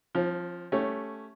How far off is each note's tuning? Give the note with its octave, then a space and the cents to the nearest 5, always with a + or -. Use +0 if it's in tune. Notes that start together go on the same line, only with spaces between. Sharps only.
F3 +0 C4 +35
A3 +0 C#4 +0 G4 +0